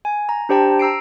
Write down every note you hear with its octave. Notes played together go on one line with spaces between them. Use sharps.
G#5
A#5
D4 G4 C5 G5 A5 A#5
A#5 E6 C7 D7